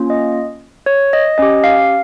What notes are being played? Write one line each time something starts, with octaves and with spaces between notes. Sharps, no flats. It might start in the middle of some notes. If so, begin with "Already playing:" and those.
Already playing: A#3 C#4 F4
D#5
C#5
D#5
C#4 G4 D#5
F5